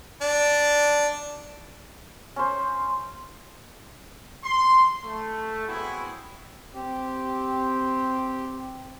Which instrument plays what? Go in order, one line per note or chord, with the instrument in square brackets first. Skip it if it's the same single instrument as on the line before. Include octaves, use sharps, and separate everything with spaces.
[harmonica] D4
[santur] C#4 C5
[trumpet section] C6
A3
B3 C4 E4 F#4 G#4 C#5
[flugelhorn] C4 [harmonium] G4